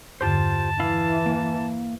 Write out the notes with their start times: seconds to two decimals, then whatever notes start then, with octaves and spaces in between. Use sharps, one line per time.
0.21 E2 G2 D3 F4 G4 C5 A5
0.80 E3 E4 F5
1.26 A#3